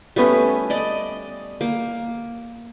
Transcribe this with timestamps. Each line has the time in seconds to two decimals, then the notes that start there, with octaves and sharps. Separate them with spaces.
0.16 G3 A3 B3 C#4
0.70 D5 D#5
1.61 A#3